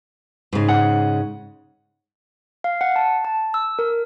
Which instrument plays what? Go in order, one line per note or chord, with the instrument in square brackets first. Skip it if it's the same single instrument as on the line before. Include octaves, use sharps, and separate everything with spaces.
[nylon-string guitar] G#2 C#3
[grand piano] F#5
[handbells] F5
F#5
A5
A5
E6
A#4